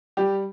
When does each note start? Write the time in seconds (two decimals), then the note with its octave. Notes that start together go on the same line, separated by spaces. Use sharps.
0.17 G3 G4